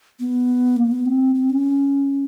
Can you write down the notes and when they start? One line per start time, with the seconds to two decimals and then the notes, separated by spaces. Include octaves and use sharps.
0.20 B3
0.77 A#3
0.91 B3
1.06 C4
1.35 C4
1.50 C#4